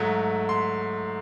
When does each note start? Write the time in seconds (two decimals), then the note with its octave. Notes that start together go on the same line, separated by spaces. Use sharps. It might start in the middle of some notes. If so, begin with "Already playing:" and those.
Already playing: G#2 F#3 A3
0.49 C6